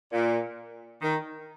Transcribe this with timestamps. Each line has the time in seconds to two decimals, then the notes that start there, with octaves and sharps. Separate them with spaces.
0.12 A#2
1.01 D#3